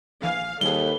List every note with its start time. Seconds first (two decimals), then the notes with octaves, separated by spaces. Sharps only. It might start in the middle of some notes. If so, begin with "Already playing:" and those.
0.22 A#1 E3 F5 G#5
0.61 D#2 G3 G#4 A4 B4 G7